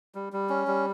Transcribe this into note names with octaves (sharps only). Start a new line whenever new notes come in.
G3
G3
C#4
G3